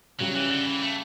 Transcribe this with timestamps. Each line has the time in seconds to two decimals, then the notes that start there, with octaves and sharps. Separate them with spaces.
0.20 C#3 F#3 G3 C#4
0.35 E3
0.51 D3
0.67 E3
0.82 A3